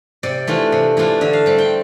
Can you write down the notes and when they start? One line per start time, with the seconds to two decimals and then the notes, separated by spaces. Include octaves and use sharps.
0.23 C3 D5
0.47 E3 A3 D4 F4
0.72 C3
0.97 E3 A3 D4 F4
1.21 D3 E5
1.33 F5
1.46 G3 C4
1.58 G5